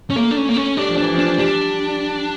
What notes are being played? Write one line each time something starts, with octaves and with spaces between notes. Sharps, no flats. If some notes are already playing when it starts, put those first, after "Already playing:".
C#4
A3 A#3
D4
C#4
A#3
C#4
G3 D4
F3
E3 D4
F3 D4
G3 D4